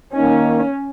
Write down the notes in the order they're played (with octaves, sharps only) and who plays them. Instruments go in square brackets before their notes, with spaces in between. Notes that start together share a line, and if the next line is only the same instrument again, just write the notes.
[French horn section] D#3 A#3 D#4 [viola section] C#4